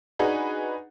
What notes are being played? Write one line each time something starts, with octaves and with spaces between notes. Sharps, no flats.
D4 D#4 F#4 G#4 B4